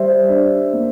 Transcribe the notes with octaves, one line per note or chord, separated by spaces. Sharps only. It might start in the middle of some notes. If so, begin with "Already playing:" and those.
Already playing: G3 C5 E5
D4
A#3